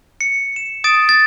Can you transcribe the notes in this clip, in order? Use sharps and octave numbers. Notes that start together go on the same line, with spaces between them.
C#7
E7
D#6 A6 D7 E7
A6